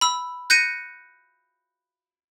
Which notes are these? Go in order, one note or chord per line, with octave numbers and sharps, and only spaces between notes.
B5 E6
F#6 G6 A#6 C#7 D#7